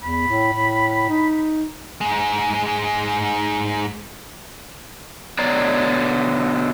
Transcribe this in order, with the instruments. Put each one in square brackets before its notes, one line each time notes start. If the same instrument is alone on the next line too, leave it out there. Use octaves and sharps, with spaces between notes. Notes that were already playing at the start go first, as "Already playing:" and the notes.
[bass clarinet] E2 [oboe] B5
[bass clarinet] A2
A2
D#4
[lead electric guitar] G#2 G#3
[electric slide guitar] B2 D3 C#5 D5 A#5